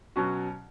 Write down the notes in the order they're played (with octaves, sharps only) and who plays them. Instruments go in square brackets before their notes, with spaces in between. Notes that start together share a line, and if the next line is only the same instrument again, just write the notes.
[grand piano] B2 F#3 C#4 F#4